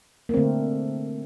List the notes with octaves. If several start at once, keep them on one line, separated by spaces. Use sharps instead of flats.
A#3
D3 A3 C4